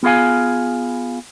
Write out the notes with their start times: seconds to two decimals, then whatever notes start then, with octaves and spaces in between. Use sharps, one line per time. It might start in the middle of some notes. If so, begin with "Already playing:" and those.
0.03 B3 F4 G#4 F5 G#5